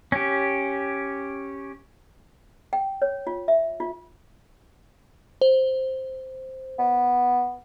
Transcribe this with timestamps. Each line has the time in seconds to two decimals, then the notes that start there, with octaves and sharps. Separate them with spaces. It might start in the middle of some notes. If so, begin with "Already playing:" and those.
0.12 C#4 G4
2.73 G5
3.02 C#5
3.27 F4
3.48 E5
3.80 F4
5.41 C5
6.79 B3